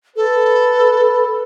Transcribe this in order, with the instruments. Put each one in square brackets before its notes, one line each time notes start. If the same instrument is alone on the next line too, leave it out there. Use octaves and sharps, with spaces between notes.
[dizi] A4 [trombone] B4